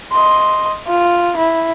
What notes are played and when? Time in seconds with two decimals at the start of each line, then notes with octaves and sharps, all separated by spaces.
0.12 D#5 C6
0.87 F4
1.37 E4